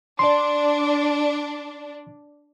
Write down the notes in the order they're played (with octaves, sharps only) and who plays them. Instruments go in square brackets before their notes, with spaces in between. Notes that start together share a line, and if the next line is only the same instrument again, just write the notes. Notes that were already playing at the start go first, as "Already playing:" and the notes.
[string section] D4 [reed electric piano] D5 C6